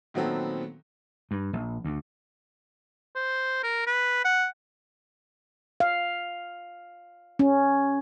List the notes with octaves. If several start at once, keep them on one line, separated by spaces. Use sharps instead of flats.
A#2 D#3 F#3 B3 C4 A4
G2
A#1
D2
C5
A#4
B4
F#5
F5
C#4